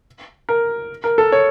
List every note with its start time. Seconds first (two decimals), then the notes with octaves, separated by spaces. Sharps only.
0.49 A#4
1.04 A#4
1.18 A4
1.32 C#5